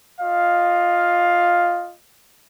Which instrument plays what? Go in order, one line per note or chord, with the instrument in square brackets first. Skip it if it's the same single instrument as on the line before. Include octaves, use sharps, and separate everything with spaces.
[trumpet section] F4 D#5 F5